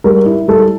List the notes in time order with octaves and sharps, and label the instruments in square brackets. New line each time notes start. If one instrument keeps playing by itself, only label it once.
[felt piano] G3 [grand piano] A#4
[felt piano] E4
[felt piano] G3 [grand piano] A4